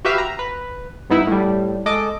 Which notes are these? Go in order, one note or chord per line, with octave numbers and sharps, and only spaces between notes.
F#4 G4 B4 E5 F5
A#5
B4
G2 B3 D#4 E4
A2 G3
G#3 A4 D#5 D6